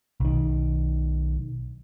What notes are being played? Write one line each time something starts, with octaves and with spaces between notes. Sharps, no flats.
B1 D#3